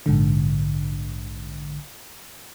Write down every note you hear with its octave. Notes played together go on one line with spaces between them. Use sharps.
A#1 G#2 D3